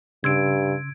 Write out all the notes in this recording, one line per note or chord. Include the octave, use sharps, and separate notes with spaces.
G2 C#3 C6 E6 G#6 D7